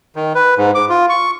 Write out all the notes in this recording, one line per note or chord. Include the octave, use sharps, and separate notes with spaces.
D#3
B4
G#2
D6
F4
C#6